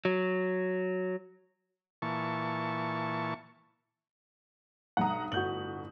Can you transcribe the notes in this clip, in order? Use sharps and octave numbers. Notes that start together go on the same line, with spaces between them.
F#3
A#2 E3 A5 C#6
B1 G2 F#5 A#5 D#6
G1 A2 F#4 G6 F#7